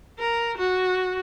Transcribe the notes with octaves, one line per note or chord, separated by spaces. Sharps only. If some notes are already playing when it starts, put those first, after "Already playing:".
A#4
F#4